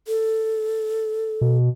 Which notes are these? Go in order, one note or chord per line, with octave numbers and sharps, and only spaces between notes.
A4
B2